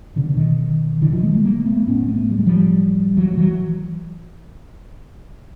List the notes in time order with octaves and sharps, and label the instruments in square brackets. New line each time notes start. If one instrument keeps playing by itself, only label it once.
[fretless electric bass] B2 D3
D3
D#3
D3 E3
D#3 F3
G#3 A#3
G3 A3
G#3 A#3
A3 B3
A2 B3 C#4
C4
A3 B3
G3
G#3
F3 G3
E3 F#3
G3
E3 F#3